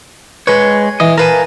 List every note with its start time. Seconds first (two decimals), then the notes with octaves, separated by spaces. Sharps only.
0.47 G#3 B4 C#5
1.00 E3 D#5
1.18 A#4 B4 F5 G#5 A5